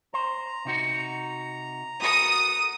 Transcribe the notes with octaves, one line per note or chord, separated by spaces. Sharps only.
C5 A#5
C3 D#4 F#4
F#4 A4 A#4 D#6